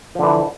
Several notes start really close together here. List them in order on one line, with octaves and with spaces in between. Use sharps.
F3 D3 E3